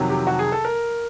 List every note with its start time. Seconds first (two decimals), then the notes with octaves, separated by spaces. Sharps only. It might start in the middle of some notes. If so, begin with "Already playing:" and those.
Already playing: F2 C3 D#3 F#3
0.10 G4
0.27 F#4
0.39 G#4
0.52 A4
0.65 A#4